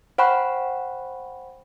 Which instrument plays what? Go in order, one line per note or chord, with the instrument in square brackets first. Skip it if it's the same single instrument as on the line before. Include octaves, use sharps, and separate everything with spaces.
[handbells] C5 F#5 G5 B5 C#6 F#6